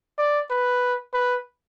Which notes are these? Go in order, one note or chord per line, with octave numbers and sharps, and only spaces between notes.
D5
B4
B4